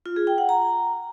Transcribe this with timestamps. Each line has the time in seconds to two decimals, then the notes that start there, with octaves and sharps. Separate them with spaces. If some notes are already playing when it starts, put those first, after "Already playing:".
0.06 F4
0.16 G#4
0.27 G5
0.38 F#5
0.49 A#5